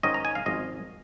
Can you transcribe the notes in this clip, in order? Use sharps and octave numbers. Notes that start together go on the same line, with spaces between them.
G#2 D#3 C#4 D#5
A#5
G#5
F5
G#1 G#2 F3 C#4 D#5